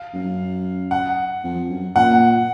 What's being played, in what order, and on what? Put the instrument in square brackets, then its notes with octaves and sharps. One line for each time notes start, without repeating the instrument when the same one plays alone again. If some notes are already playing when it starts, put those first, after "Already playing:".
Already playing: [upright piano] F5
[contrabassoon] F#2
[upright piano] F#5
[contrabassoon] F2
F#2
[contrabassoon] A#2 [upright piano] F#5